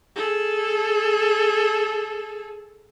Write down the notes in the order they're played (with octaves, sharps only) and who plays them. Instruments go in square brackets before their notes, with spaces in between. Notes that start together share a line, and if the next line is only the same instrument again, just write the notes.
[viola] G#4 A4